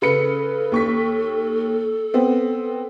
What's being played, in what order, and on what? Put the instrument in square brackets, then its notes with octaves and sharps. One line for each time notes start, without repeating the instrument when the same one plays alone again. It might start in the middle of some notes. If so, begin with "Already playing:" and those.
[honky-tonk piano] C#3 B4 C#7 [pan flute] A4
[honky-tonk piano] D#2 C#6 B6
B3 C4